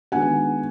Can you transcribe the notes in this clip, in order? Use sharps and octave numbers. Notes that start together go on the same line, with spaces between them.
D#3 G#3 B3 D4 F#4 F#5 G#5